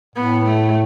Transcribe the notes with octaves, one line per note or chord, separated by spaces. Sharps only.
A2 B3
A3